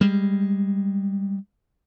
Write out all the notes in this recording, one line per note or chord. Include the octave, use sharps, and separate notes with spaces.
G3 G#3